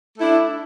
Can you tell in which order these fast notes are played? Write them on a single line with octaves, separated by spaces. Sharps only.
A3 E4 D4